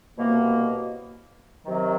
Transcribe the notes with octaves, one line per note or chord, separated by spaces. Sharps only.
C2 B2 F#3 A#3
C3 D#3 F#3